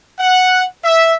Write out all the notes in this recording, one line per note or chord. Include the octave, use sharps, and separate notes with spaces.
F#5
E5